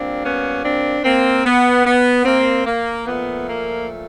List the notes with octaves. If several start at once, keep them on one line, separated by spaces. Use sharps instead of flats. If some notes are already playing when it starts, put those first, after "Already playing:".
Already playing: A#2 G3 A#3 C4 D4
B3 C#4
C4 D4
A#3 C4
B3
B3
A#3 C4
A#3
A#2 F3 A3 B3
A#3